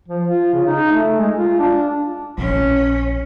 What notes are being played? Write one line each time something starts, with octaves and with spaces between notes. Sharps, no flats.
F3
F4
C#3
D#4
A3
G#3
F4
D4
A#1 C#4